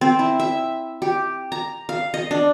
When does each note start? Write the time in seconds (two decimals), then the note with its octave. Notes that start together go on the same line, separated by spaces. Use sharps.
0.01 C4
0.19 E4
0.40 E5
1.02 G4
1.52 A#5
1.89 F5
2.14 D#5
2.31 D4